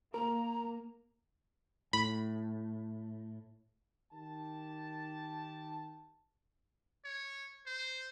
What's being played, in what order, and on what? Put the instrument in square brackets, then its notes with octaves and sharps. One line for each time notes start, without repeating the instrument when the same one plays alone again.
[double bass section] A#3 [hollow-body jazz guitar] A#4 [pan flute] A#5
[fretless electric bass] A2 [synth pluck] B5
[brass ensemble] D#3 G4 A5
[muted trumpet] C#5
C5